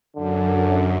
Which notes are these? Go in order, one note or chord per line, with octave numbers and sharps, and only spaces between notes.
F#2 D3